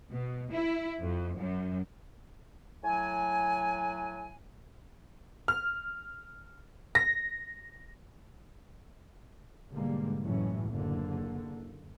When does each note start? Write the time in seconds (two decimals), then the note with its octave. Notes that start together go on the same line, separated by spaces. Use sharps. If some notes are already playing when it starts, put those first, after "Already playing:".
0.12 B2
0.51 E4
1.02 F2
1.38 F#2
2.84 A2 F#3 G#5
5.48 F6
6.95 A#6
9.72 G#2 B2 D3 G3 G#3 A#3
10.23 F#1 C#2 A2 E3 F#3 C#4
10.68 F#1 D3 A#3